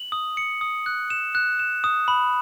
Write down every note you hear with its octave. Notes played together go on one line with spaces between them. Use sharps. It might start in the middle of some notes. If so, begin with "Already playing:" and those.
Already playing: F#7
D#6
C#7
D#6
F#6
E7
F#6
E7
D#6
B5